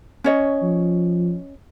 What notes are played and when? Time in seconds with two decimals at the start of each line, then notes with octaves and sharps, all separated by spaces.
0.24 C#4 C#5 D#5
0.62 F3